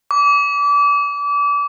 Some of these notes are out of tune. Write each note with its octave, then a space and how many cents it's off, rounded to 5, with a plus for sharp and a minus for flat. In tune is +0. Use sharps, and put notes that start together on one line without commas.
D6 -30